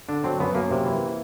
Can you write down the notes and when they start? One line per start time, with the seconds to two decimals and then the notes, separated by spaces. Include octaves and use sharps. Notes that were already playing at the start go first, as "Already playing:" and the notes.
0.09 D3 D4
0.24 F#3 C4
0.40 F#2 B3
0.55 F#2 A#3
0.71 C3
0.85 E3